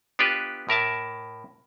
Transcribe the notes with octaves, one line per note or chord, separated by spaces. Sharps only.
B3 D4 F4 G4 B4
A2 A#4 E5 A5